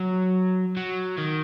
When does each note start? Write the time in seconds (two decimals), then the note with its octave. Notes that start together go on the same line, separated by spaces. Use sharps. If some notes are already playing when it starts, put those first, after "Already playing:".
Already playing: F#3
0.77 F#3
1.18 D#3